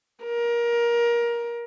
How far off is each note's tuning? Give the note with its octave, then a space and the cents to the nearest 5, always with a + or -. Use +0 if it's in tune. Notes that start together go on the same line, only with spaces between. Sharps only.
A#4 +20